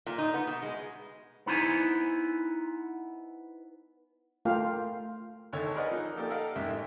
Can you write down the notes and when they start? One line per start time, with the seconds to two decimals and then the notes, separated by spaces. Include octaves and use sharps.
0.06 A#2
0.18 D#4
0.34 B3
0.47 B2
0.63 G#3
1.46 B3 D#4 E4 C5 G#5
4.45 A3 F4 A#4 F5 G5
5.53 G#1 D2 D#3 A4 C#5 E6
5.75 G#4 A#4 B4 D5 D#5 F#5
5.91 F3 D#4 A#4
6.16 A#3 G4 A4 A#4 D5
6.30 A4 A#4 D#5 F5 F#5
6.55 A1 G#2 G4 E5